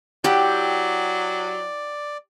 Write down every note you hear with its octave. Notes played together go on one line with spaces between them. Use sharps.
F#3 E4 G4 D5 F#5 G5